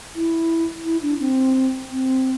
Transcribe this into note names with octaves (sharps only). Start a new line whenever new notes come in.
E4
E4
D4
C4
C4